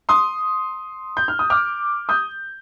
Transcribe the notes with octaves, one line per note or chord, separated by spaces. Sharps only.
C6 D#6
G6
F6
D#6
D6 F6
D#6 G6